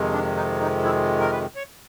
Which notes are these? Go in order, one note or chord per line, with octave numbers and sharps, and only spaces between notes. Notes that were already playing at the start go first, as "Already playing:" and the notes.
Already playing: F2 C3 D#3 G#3
D4
D#4
D#4
E4
A#4
B4
C#5